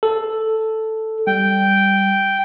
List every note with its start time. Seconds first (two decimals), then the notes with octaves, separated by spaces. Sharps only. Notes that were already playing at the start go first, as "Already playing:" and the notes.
0.03 A4
1.27 G3 G5